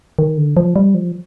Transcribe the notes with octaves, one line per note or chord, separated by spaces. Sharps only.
D#3
D3
F3
G3
F3